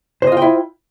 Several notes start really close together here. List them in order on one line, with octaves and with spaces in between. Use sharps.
C5 D#5 F4 G5 E4